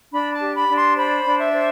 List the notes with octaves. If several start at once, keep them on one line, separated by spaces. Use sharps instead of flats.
D4 B5
A5
G4
B5
D4
C6
C5 B5
D4
E5
C5